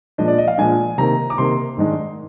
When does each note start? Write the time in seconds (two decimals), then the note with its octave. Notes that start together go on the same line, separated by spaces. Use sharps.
0.18 A#2 F3 G#3 D4 D#5
0.28 D5
0.38 D#5
0.48 F5
0.58 A#2 F3 G#3 D4 G#5
0.98 C3 D#3 A#3 A#5
1.30 D6
1.38 C3 D#3 A#3 C6
1.77 G#2 D#3 G#3 D4